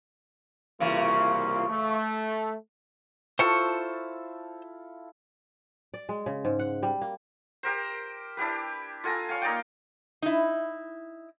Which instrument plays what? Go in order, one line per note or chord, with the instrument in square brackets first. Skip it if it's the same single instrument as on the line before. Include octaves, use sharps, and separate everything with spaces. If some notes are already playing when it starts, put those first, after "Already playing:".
[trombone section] C2 A#3 F4 [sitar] C#3 E3 F#4
[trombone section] A3
[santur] E4 F4 A4 [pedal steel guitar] C5 A5 E6 [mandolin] C#6
[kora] D5
G#3
C#3
G#2
F#5
G3
A#3
[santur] G4 A#4 C5
D4 E4 G4 B4
F4 A4 G#5 A#5
C#5 F5 G#5
A#3 D#4 D5 G5
[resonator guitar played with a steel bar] D#4 E4